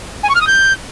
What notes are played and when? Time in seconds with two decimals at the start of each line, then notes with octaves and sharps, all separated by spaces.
0.23 G#5
0.29 C#6
0.35 F6
0.41 D#6
0.47 G6